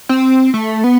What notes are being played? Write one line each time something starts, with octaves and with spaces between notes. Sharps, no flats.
C4
A3
B3